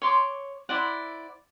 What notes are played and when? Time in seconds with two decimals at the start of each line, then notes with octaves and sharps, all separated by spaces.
0.02 C#5 C6 D6
0.69 E4 C5 D5 F#5